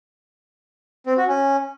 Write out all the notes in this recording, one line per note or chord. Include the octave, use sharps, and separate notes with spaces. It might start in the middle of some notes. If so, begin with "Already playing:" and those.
C4
F#4
C#4